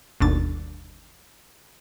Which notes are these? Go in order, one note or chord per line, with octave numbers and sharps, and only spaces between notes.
G1 D#2 B2 D4 A6